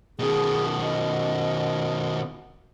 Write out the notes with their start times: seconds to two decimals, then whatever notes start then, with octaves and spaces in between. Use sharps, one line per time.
0.19 B2 D#3 G#4
0.82 D#5